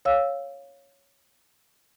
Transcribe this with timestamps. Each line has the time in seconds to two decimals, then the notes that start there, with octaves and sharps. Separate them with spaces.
0.05 C#5 F5 E6